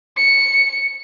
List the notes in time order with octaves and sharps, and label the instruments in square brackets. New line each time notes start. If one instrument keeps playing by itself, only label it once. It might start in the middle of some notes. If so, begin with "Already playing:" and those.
[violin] C#7